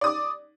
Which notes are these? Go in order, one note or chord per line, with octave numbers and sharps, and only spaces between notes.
D5 D6 D#6